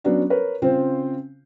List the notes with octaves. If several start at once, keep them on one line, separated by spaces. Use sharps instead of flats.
F#3 B3 C#4 D4 F#4
A#4 B4 C#5
C#3 C4 F4 C5